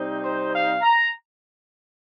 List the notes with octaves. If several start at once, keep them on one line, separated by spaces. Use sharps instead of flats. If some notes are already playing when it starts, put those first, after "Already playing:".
Already playing: C3 G3 C4 D#4
C5
F5
A#5